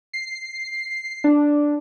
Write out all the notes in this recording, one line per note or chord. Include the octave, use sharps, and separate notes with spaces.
C7
D4